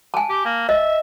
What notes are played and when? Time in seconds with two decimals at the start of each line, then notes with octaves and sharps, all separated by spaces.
0.14 G#5 A5
0.29 G4
0.45 A#3
0.69 D#5 E5